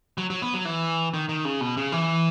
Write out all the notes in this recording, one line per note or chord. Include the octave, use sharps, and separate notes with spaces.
F#3
F#3
B3
F#3
E3
D#3
D#3
C#3
B2
C#3
E3